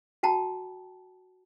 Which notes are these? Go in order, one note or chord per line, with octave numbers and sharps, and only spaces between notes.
F#4 G5 A5 A#5